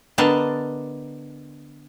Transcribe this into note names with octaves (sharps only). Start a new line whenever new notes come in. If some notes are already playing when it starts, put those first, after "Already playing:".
D3 B3 D4 A#4 D#5 A5